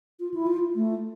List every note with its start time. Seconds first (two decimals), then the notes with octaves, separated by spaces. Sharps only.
0.20 F4
0.34 E4
0.47 F4
0.75 A3